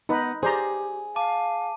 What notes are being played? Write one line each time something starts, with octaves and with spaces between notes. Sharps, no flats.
B3 D#4 B4
G4 G#4 C5 D5 A#5
F5 A5 D6 D#7